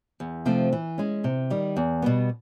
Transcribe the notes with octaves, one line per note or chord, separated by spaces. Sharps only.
E2
C3 F3 A3 C4
E3
G#3 C#4
C3
D#3 G3
E2
B2 G3 B3